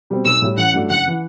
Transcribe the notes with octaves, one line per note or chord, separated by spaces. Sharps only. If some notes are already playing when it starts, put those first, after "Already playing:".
B2 G3 C4
B1 E6
A2 G3
A1 F#5
G2 F#3 A3 D4
F#1 F#5
E3